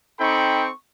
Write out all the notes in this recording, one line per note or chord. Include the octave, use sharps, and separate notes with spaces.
C4 D#4 A4 G5 B5 C#6